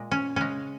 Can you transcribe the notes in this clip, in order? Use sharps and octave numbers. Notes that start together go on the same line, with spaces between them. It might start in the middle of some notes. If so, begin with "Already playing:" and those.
Already playing: A#2 G#3
C#4
C#3 G#3 C#4